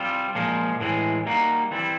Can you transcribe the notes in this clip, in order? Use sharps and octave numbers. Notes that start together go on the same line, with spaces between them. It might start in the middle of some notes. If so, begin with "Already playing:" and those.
Already playing: G3 C4 F4
A#2 F3 G#3
A2 E3 G#3
G3 A#3 D#4 F#4
E3 G3 C4 E4